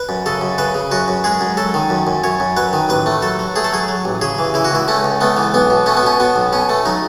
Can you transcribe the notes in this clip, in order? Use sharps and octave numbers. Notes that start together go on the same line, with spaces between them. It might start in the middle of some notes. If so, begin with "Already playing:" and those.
Already playing: B4
F#2
C#3 A4
F#2
C#3 B4
C#3
F#2 F#4
F#2
G#3 G#4
F#2
F#3 A4
D#3
F#2
F#2
F#2 C#5
F#2
F#3 B4
D#3
A1 B4
A3
F#3 A4
F#3
A3 G#4
A4
F#3 G#4
F#3
A1
C#3 G#4
E3
C#3 E4
F#4
C#2 E4
A3 C#4
C#2
A3 B3
E3
B1 B3
B2
A3 C#4
B3
B2 C#4
B2 B3
B1
B2 C#4
A3
F#3 D#4